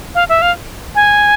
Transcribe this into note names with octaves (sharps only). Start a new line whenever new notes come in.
F5
E5
F5
G#5